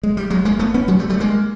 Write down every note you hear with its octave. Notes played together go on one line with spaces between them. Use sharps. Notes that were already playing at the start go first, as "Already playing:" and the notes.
G#3
G3
F#3 G#3
G#3 A#3
A3 B3
B3 C#4
F#3 G#3
G3 A3
G3 A3
G#3 A#3